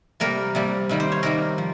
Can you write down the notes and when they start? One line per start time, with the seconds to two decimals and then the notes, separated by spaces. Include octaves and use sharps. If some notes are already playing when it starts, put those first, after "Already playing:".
0.20 C3 G3 A#3 A#4
0.55 C3 G3 A#3
0.89 C3 D#3 G3 A#3
1.00 C5
1.12 C#5
1.23 C3 D#3 G3 A#3 A#4
1.58 F3